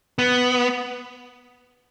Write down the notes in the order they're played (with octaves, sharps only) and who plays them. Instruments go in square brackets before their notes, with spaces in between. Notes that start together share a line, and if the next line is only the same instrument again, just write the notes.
[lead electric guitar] B3